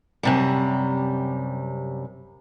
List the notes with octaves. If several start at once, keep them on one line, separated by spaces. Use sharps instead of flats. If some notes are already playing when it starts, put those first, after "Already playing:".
F#2 C3 G3